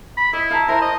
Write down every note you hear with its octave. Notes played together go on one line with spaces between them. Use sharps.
B5
E4 D#5
F5 A5 A#5
E4 A#4 C5
D#5